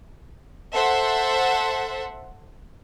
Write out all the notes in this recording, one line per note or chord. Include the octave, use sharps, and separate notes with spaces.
A4 C5 E5 F#5